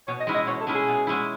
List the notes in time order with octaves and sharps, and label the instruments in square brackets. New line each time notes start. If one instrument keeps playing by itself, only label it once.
[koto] B2 [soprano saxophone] C#5
[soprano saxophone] D#5
[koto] G#3 C#4 E4
[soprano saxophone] D#5
[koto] B2 [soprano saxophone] C#5
[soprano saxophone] A4
[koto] G#3 C#4 E4
[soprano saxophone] G#4
[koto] B2
G#3 C#4 E4